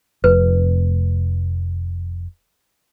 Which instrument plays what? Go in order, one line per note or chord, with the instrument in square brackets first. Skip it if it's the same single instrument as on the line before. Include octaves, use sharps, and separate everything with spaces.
[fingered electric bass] F1 [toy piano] B4